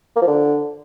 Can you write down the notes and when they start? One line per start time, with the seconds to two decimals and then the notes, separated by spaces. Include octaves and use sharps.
0.16 A#3
0.22 F3
0.27 D3